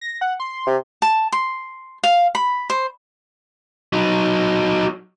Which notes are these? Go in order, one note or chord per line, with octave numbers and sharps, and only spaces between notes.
A#6
F#5
C6
C3
A5
C6
F5
B5
C5
F#3 D#4